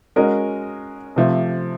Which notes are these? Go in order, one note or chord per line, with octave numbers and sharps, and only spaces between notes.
G#3 C#4 F#4 A#4 D#5
C3 F3 A3